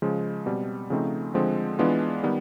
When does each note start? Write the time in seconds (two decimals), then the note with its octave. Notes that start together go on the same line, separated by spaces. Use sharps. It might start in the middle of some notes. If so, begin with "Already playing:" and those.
0.02 C#3 F3 G#3
0.46 B2 G3 C4
0.90 C#3 F3 A3 C4 D#4
1.34 D3 F3 G#3 C4
1.79 E3 G#3 B3 D4 F4
2.23 D#3 G3 B3